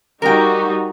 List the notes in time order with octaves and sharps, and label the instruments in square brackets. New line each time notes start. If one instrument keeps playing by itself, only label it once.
[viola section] G3 D#4 F#4 [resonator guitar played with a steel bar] A#4 G5